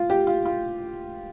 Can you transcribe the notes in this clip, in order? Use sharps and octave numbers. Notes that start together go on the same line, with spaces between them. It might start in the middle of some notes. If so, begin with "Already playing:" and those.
Already playing: F4
G4
F4
F4